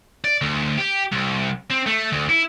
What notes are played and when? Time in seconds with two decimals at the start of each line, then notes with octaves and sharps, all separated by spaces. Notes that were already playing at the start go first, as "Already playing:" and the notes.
0.24 D5
0.41 D2
0.78 G4
1.12 C2
1.70 C4
1.86 A3
2.12 D2
2.29 E4